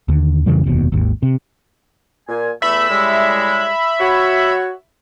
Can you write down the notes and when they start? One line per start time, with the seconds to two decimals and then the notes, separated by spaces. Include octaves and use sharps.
0.08 D#2 D3
0.46 F2 C#3 E3 G3
0.66 F1 D#2 B2
0.92 G#1 D#2
1.23 C3
2.28 A#2 G#5
2.62 E2 A3 E5 B5
2.89 A2 G3 G#3
4.00 F#4 C#5